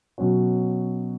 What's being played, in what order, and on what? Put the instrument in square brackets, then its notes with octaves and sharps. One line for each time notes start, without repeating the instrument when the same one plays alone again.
[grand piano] B2 F#3 C#4 F#4